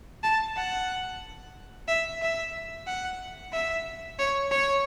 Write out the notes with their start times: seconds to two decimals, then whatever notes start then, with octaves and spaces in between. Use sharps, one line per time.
0.23 A5
0.56 F#5
1.88 E5
2.21 E5
2.87 F#5
3.53 E5
4.19 C#5
4.51 C#5